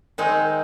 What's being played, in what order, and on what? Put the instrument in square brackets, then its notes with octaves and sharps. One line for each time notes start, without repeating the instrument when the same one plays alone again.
[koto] D#3 G#3 C4 D#4